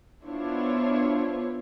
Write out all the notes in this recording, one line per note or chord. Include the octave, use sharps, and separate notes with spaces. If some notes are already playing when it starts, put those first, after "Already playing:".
B3 D4 E4 F4 C5 C#5